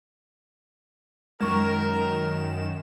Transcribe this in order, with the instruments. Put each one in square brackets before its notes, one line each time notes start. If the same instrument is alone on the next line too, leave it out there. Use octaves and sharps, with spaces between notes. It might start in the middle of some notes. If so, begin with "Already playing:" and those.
[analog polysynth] F#2 D#3 E7 [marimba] G#3 C#6 [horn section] A#4